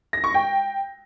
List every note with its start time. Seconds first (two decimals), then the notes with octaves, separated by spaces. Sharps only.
0.13 A#6
0.24 C#6
0.34 G5